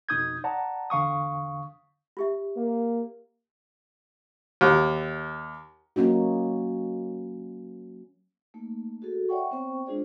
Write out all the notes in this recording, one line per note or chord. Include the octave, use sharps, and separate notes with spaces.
F2 B2 D#4 D#6 G6 G#6
D5 F#5 A5 A#5
E2 D3 F5 C#6 D#6
F4 G4 E5
A#3
D#2
F#3 A#3 C#4 D#4 F#4
A3 A#3 D#4
F#4 G#4 A4
C#5 D5 E5 F#5 G5 C#6
B3 C4 C5 G5 C#6
G#3 D4 F4 G#4 C5 D5